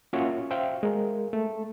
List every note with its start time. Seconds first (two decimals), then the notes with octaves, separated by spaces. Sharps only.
0.13 A#3 C#4 F4 F#4 C#5 E5
0.51 C5 E5 F5 G5
0.83 G#3 A#4
1.33 A3